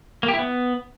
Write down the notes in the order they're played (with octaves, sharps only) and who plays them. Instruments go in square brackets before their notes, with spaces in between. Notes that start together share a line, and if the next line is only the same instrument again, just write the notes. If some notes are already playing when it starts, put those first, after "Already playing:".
[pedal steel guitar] A#3
G4
E4
B3